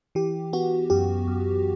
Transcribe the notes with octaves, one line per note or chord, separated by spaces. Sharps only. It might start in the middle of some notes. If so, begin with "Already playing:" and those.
E3 G4
B3 F#4
F#2 G4
F#2